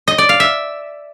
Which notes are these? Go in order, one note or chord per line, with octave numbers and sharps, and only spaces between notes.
D#5
D5
F5
E5